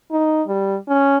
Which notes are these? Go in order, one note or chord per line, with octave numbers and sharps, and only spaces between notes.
D#4
G3
C#4